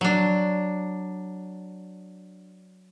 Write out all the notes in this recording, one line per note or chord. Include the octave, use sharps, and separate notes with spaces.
F#3 D4